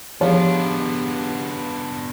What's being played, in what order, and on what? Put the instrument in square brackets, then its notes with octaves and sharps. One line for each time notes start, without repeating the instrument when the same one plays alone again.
[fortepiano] F3 [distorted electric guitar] B3 D4 [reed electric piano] G4 G#4 [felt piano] C#5